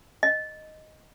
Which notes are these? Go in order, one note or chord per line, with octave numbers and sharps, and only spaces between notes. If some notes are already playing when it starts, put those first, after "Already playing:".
D#5